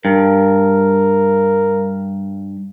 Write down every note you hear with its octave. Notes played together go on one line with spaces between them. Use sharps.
G2 A#4